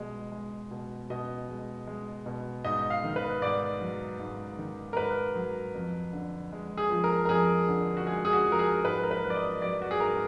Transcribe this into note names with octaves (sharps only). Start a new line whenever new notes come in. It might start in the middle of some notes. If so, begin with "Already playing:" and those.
Already playing: B2 G#3
G#3
B2
B2 D#5
G#3
G#3
B2
G#2 D#5
F5
D#3
B4
G#2 D5
F#3
G#2
D#3
A#4
G#2 B4
F#3
F2
D3
G#3
G#4
F3
A#4
A#4
F2 G#4
D3
F#4
G#3 G#4
G#4
F#4
F3
A#4
G#4
G#2 B4
A#4
B4
F#3
D5
D#5
F#3 D5
F#4
G#4
G#2 A#4